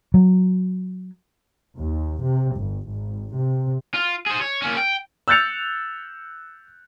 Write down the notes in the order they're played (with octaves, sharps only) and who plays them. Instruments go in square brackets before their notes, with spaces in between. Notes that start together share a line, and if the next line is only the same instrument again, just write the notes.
[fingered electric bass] F#3
[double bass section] D#2
C3
G1
G#1
C3
[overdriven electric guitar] F4
G#4 C5
C#5
A#3 C#4
G5
[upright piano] E6 F#6 G6 A6 C#7 F7